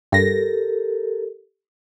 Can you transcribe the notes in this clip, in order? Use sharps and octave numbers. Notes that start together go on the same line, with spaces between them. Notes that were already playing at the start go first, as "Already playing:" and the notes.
G2 G4 A4 A#4 A#6